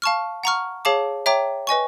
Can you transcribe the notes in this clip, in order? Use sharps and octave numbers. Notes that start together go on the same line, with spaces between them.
F5 A5 C#6 F6
F#5 A#5 C#6 F6
G#4 C#5 F5 A5 D6
C#5 E5 G5 A#5 D6
B4 D#5 G#5 C#6